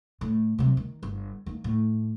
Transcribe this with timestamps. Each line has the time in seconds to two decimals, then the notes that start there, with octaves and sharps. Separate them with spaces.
0.21 A2
0.59 C3 F#3
0.77 D#3
1.03 G1
1.46 D#3 A#3
1.64 A2